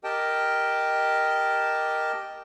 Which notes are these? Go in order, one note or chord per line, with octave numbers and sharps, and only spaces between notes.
G4 A#4 D#5 G5 A5